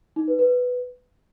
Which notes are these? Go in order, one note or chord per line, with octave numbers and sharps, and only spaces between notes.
D#4
B4
B4